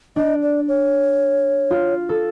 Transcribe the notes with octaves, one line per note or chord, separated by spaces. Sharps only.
D4 D#5
D5
C#5
F4
A4